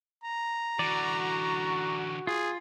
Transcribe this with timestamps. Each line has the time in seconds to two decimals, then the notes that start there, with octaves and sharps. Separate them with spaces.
0.24 A#5
0.79 D3 E3 F#4 D5
2.27 F4 G#4